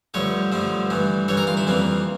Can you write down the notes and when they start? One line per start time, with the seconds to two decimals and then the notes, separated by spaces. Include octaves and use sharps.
0.14 G2 D3 F3 A3 C#5
0.52 G2 D3 F3 A3
0.90 G2 E3 A3
1.28 G2 E3 A3 C#5
1.37 A#4
1.47 F4
1.57 E4
1.67 F2 E3 G3 A#3